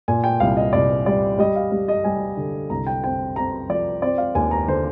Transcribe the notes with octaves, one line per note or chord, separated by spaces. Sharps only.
A#2 G#5
G5
C2 F5
D#5
C2 D5
G3 D5
G3 D#5
F5
G3
D#5
G3 G#5
D3
C2 A#5
G5
C4 G5
C4 A#5
F3 D5
C4 D5
F5
D#2 G#5
A#5
D3 C5